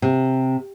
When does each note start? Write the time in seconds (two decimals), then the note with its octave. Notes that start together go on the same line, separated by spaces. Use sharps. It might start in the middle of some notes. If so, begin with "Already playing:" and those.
0.02 C3